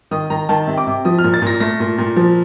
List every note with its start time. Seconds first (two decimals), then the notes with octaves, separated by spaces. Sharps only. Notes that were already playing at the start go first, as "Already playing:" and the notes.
0.11 D#3 D#6
0.30 D#3 A#5
0.49 D#3 A5
0.67 C3
0.78 D6
0.87 C3
1.05 F3 D#6
1.19 F6
1.24 A#2
1.34 A6
1.42 A#2 A#6
1.60 A3 A#6
1.80 A#2
1.98 A#2
2.16 F3